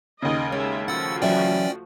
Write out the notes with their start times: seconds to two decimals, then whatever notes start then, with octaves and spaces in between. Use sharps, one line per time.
0.22 D#2 C#3 D#5
0.52 G#3 C#4 E5
0.88 F3 A3 F#4 F#5 E6 A6
1.22 E3 F#3 C#4 D5 E5 G5